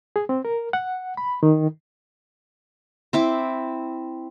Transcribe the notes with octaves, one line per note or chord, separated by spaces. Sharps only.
G#4
C4
A#4
F#5
B5
D#3
C4 E4 D6